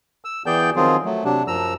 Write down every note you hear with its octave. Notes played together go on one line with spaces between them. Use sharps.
E6
E3 B3 G#4 D5 G5 G6
D#3 F3 F#3 C4 F4 G#4
F#3 A3
C3 F#3 D4
F#2 F3 A#5 E6